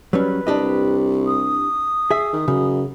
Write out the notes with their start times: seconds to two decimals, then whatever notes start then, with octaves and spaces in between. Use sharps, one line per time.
0.13 F#3 G3 C#4 B4
0.47 C2 D4 G4 D#5
1.27 D#6
2.11 G#4 E5
2.33 D#3
2.48 F#2 C#3